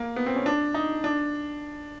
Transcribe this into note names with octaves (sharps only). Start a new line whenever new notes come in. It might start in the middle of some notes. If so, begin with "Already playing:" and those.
Already playing: A#3
B3
C4
C#4
D4
D#4
D4